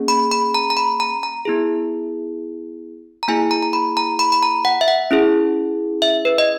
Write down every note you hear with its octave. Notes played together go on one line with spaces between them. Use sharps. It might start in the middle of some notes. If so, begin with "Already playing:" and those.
Already playing: A#3 C#4 G#4
B5
B5
A#5
A#5
B5
A#5
A#5
B3 E4 G#4
A#5
A#3 E4 G#4 G#5
A#5
A#5
B5
A#5
B5
B5
A#5
F#5
E5
F#5
C#4 E4 G#4
E5
B4
D#5